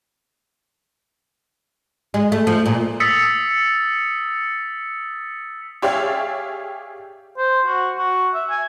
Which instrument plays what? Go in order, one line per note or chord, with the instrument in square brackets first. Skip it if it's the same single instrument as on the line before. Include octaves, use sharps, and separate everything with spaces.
[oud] G#3
A3
F3
A#2
[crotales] D#6 E6 A6 B6 C#7
[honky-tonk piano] G4 G#4 C#5 D5 E5 F5
[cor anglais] C5
F#4
F#4
E5
G#5